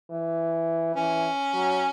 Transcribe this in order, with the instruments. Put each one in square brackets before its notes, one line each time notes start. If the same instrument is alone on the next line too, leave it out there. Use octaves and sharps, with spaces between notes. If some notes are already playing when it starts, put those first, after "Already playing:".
[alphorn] E3
[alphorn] E3 [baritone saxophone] C#4
[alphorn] F#3